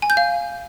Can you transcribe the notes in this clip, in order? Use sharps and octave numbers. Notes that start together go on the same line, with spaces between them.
G#5
G6
F5